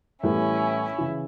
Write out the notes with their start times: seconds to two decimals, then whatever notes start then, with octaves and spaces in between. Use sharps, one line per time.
0.23 A2 E3 G3 B3 C#4 E4
0.98 C#3 E3